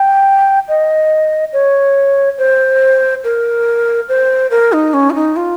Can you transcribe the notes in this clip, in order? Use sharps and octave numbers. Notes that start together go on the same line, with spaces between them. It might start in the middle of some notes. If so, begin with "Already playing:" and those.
Already playing: G5
D#5
C#5
C5
A#4
C5
A#4
D#4
C#4
F4
D#4
F4